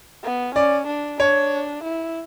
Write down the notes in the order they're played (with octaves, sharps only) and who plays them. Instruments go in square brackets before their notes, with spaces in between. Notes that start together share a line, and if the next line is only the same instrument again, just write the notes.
[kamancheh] B3
[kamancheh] C#4 [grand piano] D5
[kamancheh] D4
[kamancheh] D4 [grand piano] C#5
[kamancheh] E4